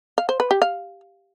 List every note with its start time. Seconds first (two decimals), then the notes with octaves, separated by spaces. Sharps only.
0.18 F5
0.29 C5
0.40 B4
0.51 G4
0.62 F5